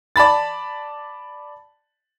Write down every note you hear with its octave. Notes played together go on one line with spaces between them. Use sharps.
D5 A5 B5 A6